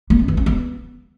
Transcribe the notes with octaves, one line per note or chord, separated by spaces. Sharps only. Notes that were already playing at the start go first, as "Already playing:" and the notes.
A#3
C#4
E3
C#4
B3